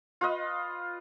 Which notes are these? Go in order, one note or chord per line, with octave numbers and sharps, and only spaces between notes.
F4 B4 D#5